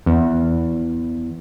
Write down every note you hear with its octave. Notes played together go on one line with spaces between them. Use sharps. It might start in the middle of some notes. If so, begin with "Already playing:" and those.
E2